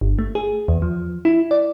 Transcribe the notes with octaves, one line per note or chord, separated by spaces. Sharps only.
G1
A3
G#4
E2
F3
E4
D5